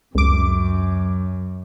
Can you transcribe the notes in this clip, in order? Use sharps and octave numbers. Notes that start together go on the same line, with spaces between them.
C#2 F#2 D6